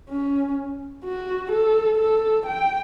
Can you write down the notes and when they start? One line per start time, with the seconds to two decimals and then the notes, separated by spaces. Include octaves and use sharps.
0.10 C#4
1.04 F#4
1.51 A4
1.99 A4
2.46 G5